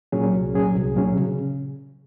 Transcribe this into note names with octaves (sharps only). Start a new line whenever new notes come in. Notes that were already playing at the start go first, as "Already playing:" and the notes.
A#2 F#3 C#4 G#4
C2
A#2 F#3 C#4 G#4
C2
A#2 F#3 C#4 G#4
C#3